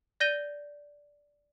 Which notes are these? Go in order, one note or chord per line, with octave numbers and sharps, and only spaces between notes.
D5 G6 A#6 D#7 G7